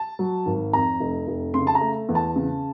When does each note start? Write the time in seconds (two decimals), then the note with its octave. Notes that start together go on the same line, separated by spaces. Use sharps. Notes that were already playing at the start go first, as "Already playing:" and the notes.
Already playing: A5
0.19 F#3
0.46 G#1
0.73 F2 A#5
1.00 F1
1.28 F1
1.54 C#3 C6
1.67 A5
1.75 A#5
1.81 A3
2.09 E2
2.15 A5
2.36 C#3